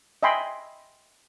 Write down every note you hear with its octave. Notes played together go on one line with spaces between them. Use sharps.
D#5 E5 G5 G#5 B5 C6